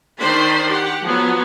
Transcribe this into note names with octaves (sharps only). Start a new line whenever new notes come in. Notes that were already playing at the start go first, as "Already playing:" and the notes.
D#3 D4 C5 B5 C6
G4 F#5
F3 F#3 B3